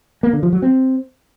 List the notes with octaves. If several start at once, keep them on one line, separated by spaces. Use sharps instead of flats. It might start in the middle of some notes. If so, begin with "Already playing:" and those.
A#3
D3
F3
F#3
C4